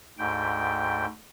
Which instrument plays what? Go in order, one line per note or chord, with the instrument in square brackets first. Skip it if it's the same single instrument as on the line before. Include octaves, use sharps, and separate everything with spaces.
[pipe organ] D2 G#2 G5